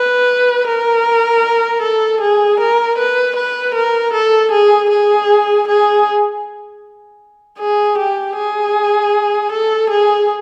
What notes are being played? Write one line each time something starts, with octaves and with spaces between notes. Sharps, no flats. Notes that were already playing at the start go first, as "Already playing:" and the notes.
Already playing: B4
A#4
A4
G#4
A#4
B4
B4
A#4
A4
G#4
G#4
G#4
G#4
G4
G#4
A4
G#4